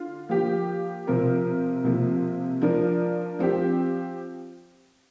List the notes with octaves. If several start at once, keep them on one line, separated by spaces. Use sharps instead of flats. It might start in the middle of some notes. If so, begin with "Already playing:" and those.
Already playing: D3 F4
F3 A#3 G4
C3 F3 C4 A#4
C3 F3 A#3
F3 D4 A#4
F3 C4 G4